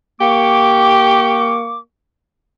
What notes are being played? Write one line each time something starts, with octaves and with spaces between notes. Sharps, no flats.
A#3 G4 C#6 D6